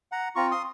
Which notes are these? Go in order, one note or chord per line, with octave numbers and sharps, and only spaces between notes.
F#5 A#5
C4 F4 A#5 C#6
C6 D#6